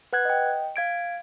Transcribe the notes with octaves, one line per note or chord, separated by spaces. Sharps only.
B4 F#5 F#6 G#6
D#5 G5
F5 G#6 D7